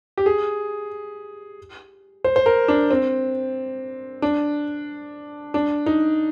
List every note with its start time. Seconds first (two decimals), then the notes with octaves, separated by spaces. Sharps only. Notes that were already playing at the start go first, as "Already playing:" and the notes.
0.18 G4
0.26 G#4
2.24 C5
2.36 C5
2.46 A#4
2.68 D4
2.91 C4
4.22 D4
5.54 D4
5.86 D#4